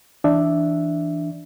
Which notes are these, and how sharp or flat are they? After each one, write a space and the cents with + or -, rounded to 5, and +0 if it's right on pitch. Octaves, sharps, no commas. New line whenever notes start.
E3 +0 D4 +0 E5 +0